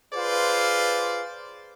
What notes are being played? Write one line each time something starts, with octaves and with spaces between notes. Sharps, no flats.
F4 G#4 B4 C5 D5